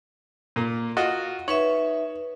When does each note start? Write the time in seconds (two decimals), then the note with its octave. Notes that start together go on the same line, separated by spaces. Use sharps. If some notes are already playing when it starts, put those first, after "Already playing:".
0.56 A#2 A#3
0.97 F4 F#4 D#5
1.48 D#4 B4 C#5 E5